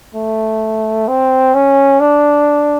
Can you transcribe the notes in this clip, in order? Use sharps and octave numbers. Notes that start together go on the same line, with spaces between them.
A3
C4
C#4
D4